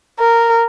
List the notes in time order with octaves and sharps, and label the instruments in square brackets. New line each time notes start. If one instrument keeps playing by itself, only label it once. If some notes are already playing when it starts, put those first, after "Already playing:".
[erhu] A#4